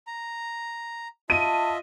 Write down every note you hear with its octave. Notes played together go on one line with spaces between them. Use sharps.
A#5
F4 D#5 E5 A5 D#7